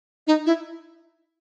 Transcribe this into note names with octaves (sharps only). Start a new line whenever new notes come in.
D#4
E4